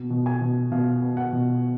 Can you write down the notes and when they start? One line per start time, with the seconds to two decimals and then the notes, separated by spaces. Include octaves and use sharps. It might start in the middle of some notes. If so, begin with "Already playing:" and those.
Already playing: B2
0.10 B2
0.26 G#5
0.41 B2
0.72 B2 F5
1.02 B3
1.17 F#5
1.33 B2